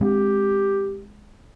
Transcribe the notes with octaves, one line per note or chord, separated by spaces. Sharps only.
G#3 C4 D4 G4